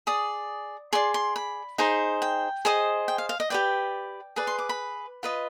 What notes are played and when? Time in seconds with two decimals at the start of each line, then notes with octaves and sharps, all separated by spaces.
0.07 G#4 D5 D#6
0.93 G#4 D5 C6
1.14 C6
1.36 B5
1.78 D#4 G#4 C5
2.22 G5
2.65 G#4 C5 D#5
3.08 G5
3.18 F5
3.29 F5
3.40 D#5
3.50 G4 B4 D5 G5
4.36 G#4 B4 D5
4.47 C6
4.58 D6
4.69 B5
5.23 F4 B4 D#5